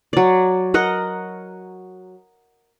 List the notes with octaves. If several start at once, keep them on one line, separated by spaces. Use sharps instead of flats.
F#3 D5
A#4 D#5 F#5